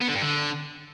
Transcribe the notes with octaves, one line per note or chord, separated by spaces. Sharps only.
B3
D3
G2
D3